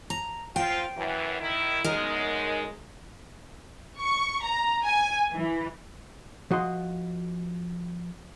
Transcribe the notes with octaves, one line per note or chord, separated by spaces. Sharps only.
A#5
F3 C4 F4 G5
F#2 E3
D#3 E4
F#2 G#3 D#4 A#4
C#6
A#5
G#5
E3
F3 F#4 D#5 C6